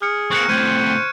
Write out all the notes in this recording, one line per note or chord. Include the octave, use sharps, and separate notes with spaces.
G#4 F6 C#7
A#3 C4 C#6 F#6 C#7
A2 C3 C5 G#6 D#7